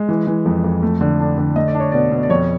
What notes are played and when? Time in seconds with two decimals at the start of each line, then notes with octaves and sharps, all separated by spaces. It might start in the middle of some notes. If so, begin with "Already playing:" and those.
Already playing: G#3
0.09 E3
0.27 E3
0.46 F2
0.64 F2
0.82 A3
1.01 D3
1.20 D4
1.38 D3
1.56 A3 D#5
1.68 D5
1.75 D4
1.80 C#5
1.92 B2 D5
2.11 B2
2.23 D5
2.30 F2 C#5